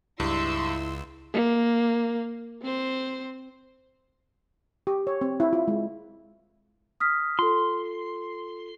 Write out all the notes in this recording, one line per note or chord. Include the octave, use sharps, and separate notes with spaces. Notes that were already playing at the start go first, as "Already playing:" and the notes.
C#2 G2 E4 C6 E6
A#3
C4 C5
G4
C#5
C4
E4
F4
G#3
D#6 F6 B6
F4 A4 C6